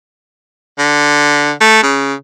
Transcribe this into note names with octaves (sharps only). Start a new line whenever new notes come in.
D3
A3
C#3